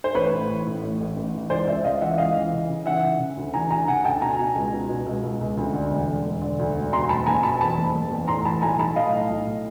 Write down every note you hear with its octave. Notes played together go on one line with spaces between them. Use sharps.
C5
A1 B4 C#5
A2
A1
A2
A1
A1
A1
E3
C#2 C5 D5
C#2 D5 E5
C#2 D#5 F5
E3 E5 F#5
C#2 D#5 F5
E3
C#3
C#3
E3 E5 F#5
C#3
C#3
D2
E3 G#5 A#5
D2 G#5 A#5
C#3 F#5 G#5
D2 G5 A5
B2 G#5 A#5
B2
C#2
B2
B2
C#2
C#2
C#2
D2
D3
E1
E1
E1
D3
D2
E1
B2 A#5 C6
F#1 A5 B5
F#1 G#5 A#5
B2 A5 B5
E2 A5 B5
F#1
F#1
E2
A2 A#5 C6
E3 A5 B5
B1 G#5 A#5
B1 A5 B5
A2 D#5 F5
A2
B1
A2